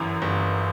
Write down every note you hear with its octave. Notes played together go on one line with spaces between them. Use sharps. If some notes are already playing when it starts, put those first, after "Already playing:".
Already playing: G1 F#2 E3
G1